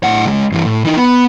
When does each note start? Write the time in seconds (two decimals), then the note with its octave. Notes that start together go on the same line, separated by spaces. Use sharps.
0.04 A2 F#5
0.26 C#2 G#3
0.52 G2 E3
0.65 A2
0.84 E3 D#4
0.97 B3